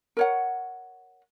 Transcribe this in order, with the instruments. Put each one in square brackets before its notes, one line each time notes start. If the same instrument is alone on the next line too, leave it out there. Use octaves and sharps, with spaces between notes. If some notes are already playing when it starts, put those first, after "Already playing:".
[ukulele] A#4 C#5 F#5